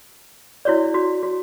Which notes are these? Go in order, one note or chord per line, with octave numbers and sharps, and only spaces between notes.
E4 F#4 C#5 D5
F#4
F#4